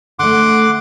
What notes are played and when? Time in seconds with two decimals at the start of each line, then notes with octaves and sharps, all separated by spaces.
0.19 D3 A3 F#5 C6 D6